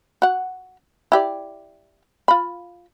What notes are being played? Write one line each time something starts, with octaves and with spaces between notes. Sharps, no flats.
F#4 F#5
E4 G4 D5
F4 B5